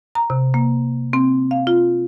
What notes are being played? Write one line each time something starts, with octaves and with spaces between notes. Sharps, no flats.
A#5
C3
A#3
C4
F5
F4